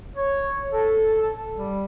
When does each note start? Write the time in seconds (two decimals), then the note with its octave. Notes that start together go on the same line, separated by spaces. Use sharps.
0.16 C#5
0.72 A4
1.57 G3